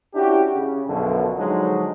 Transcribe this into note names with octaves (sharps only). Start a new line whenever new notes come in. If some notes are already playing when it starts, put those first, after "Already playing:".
C#4 D4 E4 F#4 G4
C#3
B1 F#2 B2 D3 F3 A4
D3 F3 F#3 G#3 D4 D#4